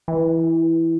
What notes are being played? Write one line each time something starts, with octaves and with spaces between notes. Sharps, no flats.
E3